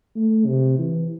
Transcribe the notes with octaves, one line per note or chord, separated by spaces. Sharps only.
A3
C3
E3